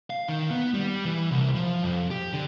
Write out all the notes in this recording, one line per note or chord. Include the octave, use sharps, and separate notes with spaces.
F5
D#3
B3
G3
E3
C2
F3
F2
G4
D3